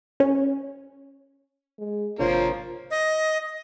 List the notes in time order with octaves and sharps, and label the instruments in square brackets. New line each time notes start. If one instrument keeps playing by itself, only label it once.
[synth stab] C#4
[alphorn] G#3
[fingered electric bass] G#1 C3 D4 [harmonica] F3 A#3 [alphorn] F4 [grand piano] C5 C#5
[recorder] D#5